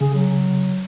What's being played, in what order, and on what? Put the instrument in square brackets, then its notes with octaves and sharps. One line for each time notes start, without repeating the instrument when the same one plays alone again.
[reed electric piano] C#3 [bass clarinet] G#4
[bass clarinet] F#3